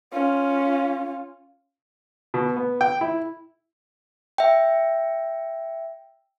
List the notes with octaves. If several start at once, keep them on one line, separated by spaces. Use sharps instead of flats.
C#4 F4
B2
B3
G5
E4
E5 G5